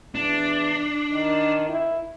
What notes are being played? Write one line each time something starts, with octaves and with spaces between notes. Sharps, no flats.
E2 D4
D#3
E4